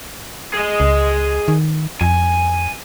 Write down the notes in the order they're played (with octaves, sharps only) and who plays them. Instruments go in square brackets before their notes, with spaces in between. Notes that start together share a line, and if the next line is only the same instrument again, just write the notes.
[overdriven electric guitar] G#4 D#5
[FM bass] C#2
D#3
[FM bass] F2 [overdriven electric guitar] G#5